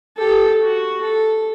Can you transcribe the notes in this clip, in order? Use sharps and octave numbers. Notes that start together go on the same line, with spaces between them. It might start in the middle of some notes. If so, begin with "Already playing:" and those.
G4 A4
F#4
A4